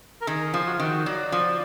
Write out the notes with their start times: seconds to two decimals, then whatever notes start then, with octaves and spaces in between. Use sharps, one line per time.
0.21 A#4
0.27 D#3 G#4
0.54 F3
0.67 F#4
0.74 F4
0.80 D#3 F#4
1.06 F#3 D5
1.32 F3